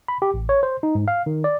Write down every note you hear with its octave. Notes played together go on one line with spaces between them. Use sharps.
B5
G4
A1
C#5
C5
D#4
G#2
F5
D#3
D5